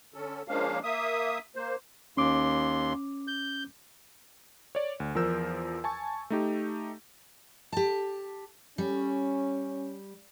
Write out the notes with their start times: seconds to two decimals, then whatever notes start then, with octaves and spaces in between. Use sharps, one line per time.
0.14 D3 C#4 A4
0.48 F3 G#3 A#3 C#4 D4 F5
0.83 A#3 E5 D#6
1.56 A#3 C5
2.17 D#2 C#4 C6 D6
3.27 G6
4.75 C#5 D5
5.00 D2
5.15 E2 F3 A#4 E6 G6
5.84 G#5 A5 C#6
6.30 A3 D#4 G4
7.72 G4 A5
8.78 G3 C#4